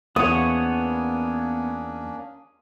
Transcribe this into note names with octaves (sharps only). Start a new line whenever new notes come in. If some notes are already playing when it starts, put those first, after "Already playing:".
E2 A#3 B3 C#4 D4 C#5 D#6